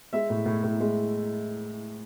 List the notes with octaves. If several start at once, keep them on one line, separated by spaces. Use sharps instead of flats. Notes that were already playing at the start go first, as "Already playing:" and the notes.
G#3 E5
A2
A2
A2
G#3